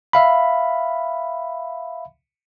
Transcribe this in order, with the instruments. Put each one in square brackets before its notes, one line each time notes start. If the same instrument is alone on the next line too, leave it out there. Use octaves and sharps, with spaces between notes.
[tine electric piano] E5 F5 B5